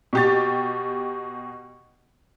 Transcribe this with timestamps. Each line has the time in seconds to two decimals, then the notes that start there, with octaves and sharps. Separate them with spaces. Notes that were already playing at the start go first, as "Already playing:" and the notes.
0.13 B2 G4 A6